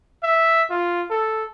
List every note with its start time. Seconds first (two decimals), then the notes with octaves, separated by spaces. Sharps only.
0.23 E5
0.70 F4
1.10 A4